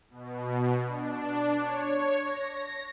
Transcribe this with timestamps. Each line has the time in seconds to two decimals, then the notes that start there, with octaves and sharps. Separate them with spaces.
0.10 B2
0.86 D4
1.58 C#5
2.22 A#6